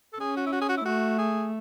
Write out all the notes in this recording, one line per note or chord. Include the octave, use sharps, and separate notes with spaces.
A4
C#4 G#4
F#4
E4
F#4
G#4
F#4
E4
A3 F#4
G#4